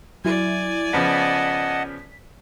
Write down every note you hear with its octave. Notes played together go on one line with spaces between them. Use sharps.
F#3 E4 D5 G#5
C#3 F3 B3 D#5 F#5 A5 B6